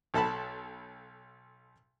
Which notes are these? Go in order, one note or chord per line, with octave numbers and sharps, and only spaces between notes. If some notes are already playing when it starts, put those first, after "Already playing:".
B1 A4 A5 B5